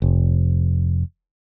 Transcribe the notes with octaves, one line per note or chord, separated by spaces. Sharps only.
F1